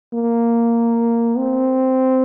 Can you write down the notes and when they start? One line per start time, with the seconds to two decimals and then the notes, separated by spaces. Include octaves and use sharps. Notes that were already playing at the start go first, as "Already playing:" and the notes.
0.14 A#3
1.37 C4